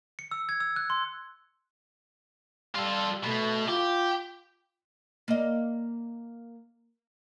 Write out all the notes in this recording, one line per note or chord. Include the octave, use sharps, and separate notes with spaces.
C#7
E6
G#6
E6
F#6
C6
G3 F4 A4
B2 A3
F4 G4
A#3 D#5